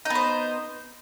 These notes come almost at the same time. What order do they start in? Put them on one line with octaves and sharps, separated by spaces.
D#4 B3 C5